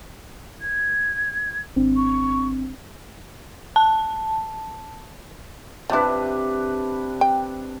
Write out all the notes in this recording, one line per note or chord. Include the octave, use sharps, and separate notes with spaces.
G#6
G#1 C4 D4
C#6
A5
C3 F3 D4 E4 B4
G5